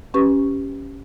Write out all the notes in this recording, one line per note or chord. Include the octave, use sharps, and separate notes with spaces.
C#4 G4 B4 C#6